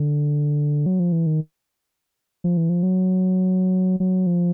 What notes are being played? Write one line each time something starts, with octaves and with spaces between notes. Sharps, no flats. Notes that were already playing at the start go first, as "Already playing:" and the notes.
Already playing: D3
F#3
F3
E3
D#3
F3
E3
F3
F#3
F#3
F3